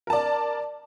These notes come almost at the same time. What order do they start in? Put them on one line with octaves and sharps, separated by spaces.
A#4 A5 D5